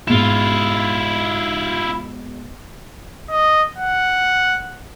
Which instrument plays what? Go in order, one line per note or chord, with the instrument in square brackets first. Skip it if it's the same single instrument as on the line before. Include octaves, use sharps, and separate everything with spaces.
[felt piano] G#2 B2 E7 [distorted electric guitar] E4 F4
[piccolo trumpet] D#5
F#5